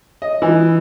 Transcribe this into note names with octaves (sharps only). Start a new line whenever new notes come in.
D#5
E3